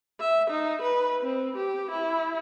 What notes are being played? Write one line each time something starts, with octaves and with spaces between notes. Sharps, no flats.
E5
D#4
B4
C4
G4
E4